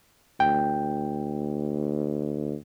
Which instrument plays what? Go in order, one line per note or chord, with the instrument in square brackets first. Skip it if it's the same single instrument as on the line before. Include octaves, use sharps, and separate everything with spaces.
[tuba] D2 [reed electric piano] G5